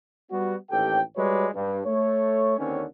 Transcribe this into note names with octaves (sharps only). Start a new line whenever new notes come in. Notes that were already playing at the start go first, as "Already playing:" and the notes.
G3 B3 F#4
A1 D#2 G4 A4 G5
G3 G#3 F#4 B4 C#5 D5
G2
A3 C#5
D#2 D3 D#3 C4 C#4